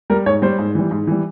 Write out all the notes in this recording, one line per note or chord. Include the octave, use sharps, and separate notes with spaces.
G3 A#4
G#2 C#5
G3 C5
G#2
E3 G3
G#2
E3 G3